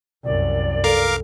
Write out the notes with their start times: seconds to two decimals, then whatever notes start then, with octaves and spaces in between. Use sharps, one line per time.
0.24 C2 F#2 D5
0.84 A4 A#4 F5 D6